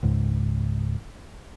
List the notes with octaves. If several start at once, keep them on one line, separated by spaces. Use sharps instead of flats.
C#2 G#2